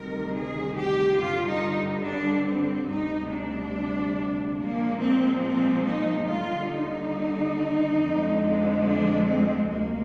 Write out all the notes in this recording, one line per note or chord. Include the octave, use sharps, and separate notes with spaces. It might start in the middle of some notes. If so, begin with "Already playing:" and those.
Already playing: D2 C3 D#3 G3 A#4
G#4
G4
G2 D3 G3 F4
D#4
D4
C4
D2 C3 G3 D#4
D4
A#2 F3 G#3 A#3
C4
C4
D#4
D#2 D3 G3 F4
D#4
F2 D3 F3 G#3
D4
C4
D2 C3 F3 G#3 A#3